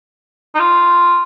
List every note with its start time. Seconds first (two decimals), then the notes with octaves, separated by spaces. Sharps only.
0.55 D#4
0.59 F4